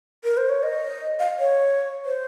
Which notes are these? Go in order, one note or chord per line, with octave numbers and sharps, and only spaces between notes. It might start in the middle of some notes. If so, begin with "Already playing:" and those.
A#4
C5
C#5
D#5
F5
C#5
C5